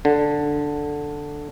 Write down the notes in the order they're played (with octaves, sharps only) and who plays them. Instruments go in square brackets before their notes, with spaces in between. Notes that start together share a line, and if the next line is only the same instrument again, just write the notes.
[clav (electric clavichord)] D3